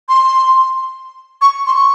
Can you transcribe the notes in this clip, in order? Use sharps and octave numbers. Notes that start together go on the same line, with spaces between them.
C6
C#6
C6
C#6